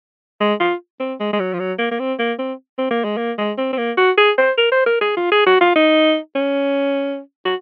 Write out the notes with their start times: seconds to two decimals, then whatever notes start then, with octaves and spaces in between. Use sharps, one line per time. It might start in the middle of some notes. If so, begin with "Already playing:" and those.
0.40 G#3
0.60 F4
1.00 C4
1.20 G#3
1.33 G#3
1.40 F#3
1.53 F3
1.59 F#3
1.79 A#3
1.91 A#3
2.00 C4
2.19 A#3
2.39 C4
2.78 C4
2.91 A#3
3.04 G#3
3.17 A#3
3.38 G#3
3.58 C4
3.73 C4
3.78 A#3
3.97 F#4
4.18 G#4
4.38 C5
4.58 A#4
4.72 C5
4.87 A#4
5.01 G#4
5.17 F4
5.32 G#4
5.47 F#4
5.61 F4
5.76 D#4
6.36 C#4
7.45 F#4